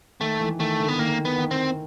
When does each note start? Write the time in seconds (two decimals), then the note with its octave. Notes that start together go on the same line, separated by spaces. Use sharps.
0.20 D#3 A3
0.41 E3
0.59 D#3 A3
0.80 D3
0.88 B3
0.99 D#3 A#3
1.25 B3
1.38 D#3
1.51 C4